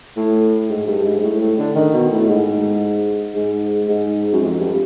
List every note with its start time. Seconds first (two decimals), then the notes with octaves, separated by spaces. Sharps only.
0.16 A2
0.70 G#2
0.87 G2
1.04 G#2
1.23 A2
1.40 A2
1.58 D3
1.75 D#3
1.93 B2
2.11 A2
2.29 G#2
3.35 G#2
3.88 G#2
4.33 F#2
4.41 F2
4.59 G2